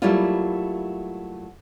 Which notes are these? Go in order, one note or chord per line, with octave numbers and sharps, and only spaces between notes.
F#3 G3 A3 A#3 E4 F4